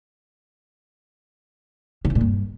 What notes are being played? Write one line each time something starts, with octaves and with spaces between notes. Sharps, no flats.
D3
E3
A#2
G2